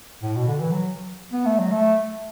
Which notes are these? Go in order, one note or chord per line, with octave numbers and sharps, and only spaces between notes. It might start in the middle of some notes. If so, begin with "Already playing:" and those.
A2
B2
D3
E3
F#3
B3
A3
F#3
A3